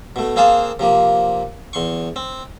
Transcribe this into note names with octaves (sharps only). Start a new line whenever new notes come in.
B2 A3
A#3 C4 G#4 C5 F5 A5
C3 F3 A#3
E2 C6 C#6
C4